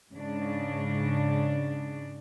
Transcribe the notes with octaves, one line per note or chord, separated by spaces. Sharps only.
G#2 C#3 D4